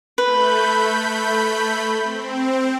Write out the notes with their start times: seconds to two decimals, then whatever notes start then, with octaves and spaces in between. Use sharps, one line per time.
0.18 A3 B4 B5 G6
2.03 C4